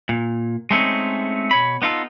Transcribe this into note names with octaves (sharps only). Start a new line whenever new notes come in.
A#2
G#3 A3 C4 C#4 D#4
B2 C#5 B5
B3 D#4 F4 A4